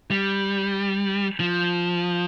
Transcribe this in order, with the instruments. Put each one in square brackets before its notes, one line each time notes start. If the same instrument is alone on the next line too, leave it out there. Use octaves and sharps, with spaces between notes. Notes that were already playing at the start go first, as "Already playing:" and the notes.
[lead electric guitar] G3
F3